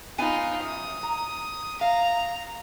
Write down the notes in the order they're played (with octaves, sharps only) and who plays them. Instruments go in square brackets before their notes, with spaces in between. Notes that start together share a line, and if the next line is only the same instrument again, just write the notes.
[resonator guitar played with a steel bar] B3 C4 G#5 [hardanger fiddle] D#4 F4
[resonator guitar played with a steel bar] F#2 [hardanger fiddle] D#6
[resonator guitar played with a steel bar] A#5
[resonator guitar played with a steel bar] F5 [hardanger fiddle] A#5